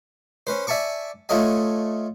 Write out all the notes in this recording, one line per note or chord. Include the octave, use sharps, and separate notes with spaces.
C#4 B4 C5
D5 E5 G#5 A5 C#6 D6
A3 F4 A4 C#5 D#5 G#5